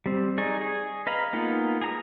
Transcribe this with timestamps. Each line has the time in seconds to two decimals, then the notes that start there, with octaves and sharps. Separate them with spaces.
0.06 G3 C4
0.38 D#4 G#4 D5 C#6
0.61 G#4 G#5
1.07 B4 D#5 F5 A#5 B5
1.33 G#3 A#3 B3 D#4 F4
1.81 G#4 A#5 D#6